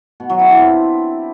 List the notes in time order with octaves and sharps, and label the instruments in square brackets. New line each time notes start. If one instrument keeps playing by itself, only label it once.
[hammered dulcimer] B2
F#3
E4
D4
C4